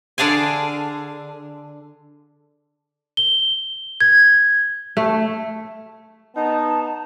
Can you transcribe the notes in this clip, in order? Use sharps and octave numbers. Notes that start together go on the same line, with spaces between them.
D3 D4 G#4 F5 G#5
G7
G#6
A3
B3 D#4 A5